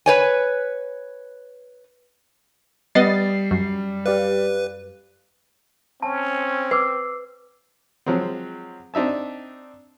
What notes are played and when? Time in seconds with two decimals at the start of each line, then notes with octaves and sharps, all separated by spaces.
0.06 B4 C#5 G#5
2.95 G3 B3 D#5 A6 C7
3.51 F#2
4.06 G4 B4 D5 F5
6.02 C4 C#4 A5
6.71 B4 D6 E6 C7
8.06 F3 F#3 G#3 C4
8.94 C4 D4 D#4 E5 A5